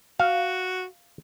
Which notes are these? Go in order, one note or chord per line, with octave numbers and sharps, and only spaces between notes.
F#4 F5